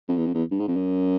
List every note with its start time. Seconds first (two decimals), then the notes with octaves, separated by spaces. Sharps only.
0.09 F2
0.17 E2
0.26 F2
0.34 E2
0.51 G2
0.60 G#2
0.68 F2
0.76 F#2